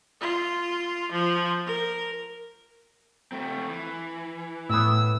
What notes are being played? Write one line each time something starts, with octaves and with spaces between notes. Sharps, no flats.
F4
F3
A#4
A3 C4
E3
A2 B3 C#4 E4 E6